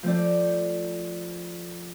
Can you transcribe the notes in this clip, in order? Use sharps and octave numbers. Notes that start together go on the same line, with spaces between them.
F3 A3 C4 D5